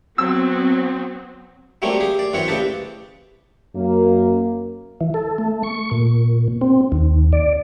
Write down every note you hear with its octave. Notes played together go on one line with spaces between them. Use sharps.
F#3 B3 C4 E6
F#3 G3 A3 A#3 C4 C#4
G4 G#4
D5
F#2 E3 C4 B4 C#5 F#5
D2 C#3 C4 G4 B4 A5
F#2 A#3
E3
A4
A3
C#6
A#2
C4
D#2
D5